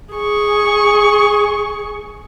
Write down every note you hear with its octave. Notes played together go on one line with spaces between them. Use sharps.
G#4 C#6